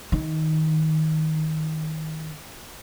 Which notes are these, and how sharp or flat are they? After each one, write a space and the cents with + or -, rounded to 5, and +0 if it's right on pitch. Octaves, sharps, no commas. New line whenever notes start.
D#3 +15